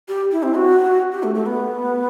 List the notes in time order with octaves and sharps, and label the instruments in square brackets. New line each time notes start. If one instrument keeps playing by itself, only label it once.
[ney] G4
E4
C4
F#4
G4
A3
A3
B3